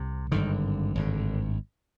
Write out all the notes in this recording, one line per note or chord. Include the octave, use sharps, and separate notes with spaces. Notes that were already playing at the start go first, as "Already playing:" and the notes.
Already playing: C2 C3
G#1 G2 D3 D#3
G#1 G2 D3